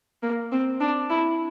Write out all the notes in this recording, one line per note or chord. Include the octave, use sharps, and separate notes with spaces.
A#3
C4
D4
E4